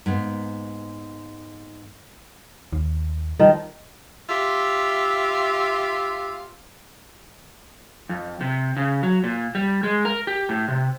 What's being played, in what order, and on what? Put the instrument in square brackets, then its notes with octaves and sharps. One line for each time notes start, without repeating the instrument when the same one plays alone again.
[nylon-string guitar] G#2 A#3 B3
[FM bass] D#2
[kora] D#3 F3 [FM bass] G3
[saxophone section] F4 G4 E5
[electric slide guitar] F2
C3
C#3
F#3
A#2
G3
G#3
A#4
G4
A2
C3